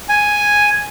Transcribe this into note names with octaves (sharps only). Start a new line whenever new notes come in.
G#5